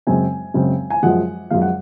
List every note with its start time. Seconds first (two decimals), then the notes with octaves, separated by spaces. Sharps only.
0.07 F#2 C#3 G#3 C4 G#5
0.54 F#2 C#3 G#3 C4
0.90 G#5
1.03 F#2 F3 G#3 F#5
1.51 F#2 F3 G#3 F5
1.62 F#5